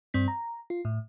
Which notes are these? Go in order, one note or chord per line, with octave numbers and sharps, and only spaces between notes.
G2 C4 B6
A#5
F4
A2